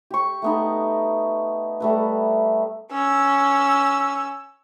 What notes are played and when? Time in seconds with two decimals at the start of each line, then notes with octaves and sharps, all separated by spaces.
0.11 G4 C#6
0.42 A3 B3 D#4
1.80 G3 A3 B4
2.92 C#4 E6